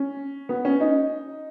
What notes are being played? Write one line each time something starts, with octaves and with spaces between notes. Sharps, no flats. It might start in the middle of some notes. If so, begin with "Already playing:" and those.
Already playing: C#4
B3
C#4
D#4